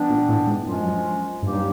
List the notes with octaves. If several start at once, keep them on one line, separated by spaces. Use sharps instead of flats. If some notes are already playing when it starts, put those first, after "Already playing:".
Already playing: E3 G3 B3 D4
A#2
A2
G#2
F#2 F3 G#3 C#4 F4
G2 F#3 A#3 D#4 G4